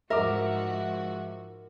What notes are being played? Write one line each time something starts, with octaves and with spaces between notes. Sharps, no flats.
G#2 F3 F#4 A#4 E5 D6